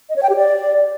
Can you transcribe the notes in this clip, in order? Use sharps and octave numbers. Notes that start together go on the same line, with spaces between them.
D#5
C#5
G5
G4
D5